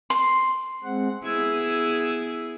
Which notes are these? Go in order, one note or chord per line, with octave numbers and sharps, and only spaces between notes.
C6
G#3 C4 F#5
B3 E4 G#4 E6 G#6